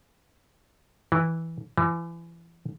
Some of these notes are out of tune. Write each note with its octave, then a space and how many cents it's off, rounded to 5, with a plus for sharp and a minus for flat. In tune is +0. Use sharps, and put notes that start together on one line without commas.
E3 -10
E3 +30